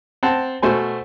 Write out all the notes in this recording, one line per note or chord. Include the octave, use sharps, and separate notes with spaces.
C4 F#5 A5
B2 A3 C5 G#5